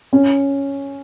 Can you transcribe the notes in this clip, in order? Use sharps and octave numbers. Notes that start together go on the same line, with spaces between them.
C#4